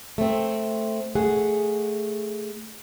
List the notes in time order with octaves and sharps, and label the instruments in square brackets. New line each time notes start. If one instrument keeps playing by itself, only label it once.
[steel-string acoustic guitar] A3 C4
A3 G#4 F#5